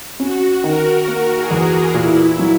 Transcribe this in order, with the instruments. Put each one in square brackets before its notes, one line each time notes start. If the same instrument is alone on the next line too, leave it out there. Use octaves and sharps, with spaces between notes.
[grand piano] C#4 [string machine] F#4
[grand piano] D#3 [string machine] A#4
[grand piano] A#3
[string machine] G#4
[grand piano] E2
[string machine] F#4
[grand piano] A#2 [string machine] E4
[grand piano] F#3